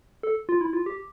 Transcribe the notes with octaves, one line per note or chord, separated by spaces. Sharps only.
A4
F4
E4
F4
G4